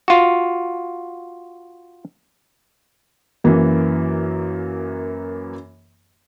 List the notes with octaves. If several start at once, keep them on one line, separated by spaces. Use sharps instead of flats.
F4 F#4
F#2 E3 A#3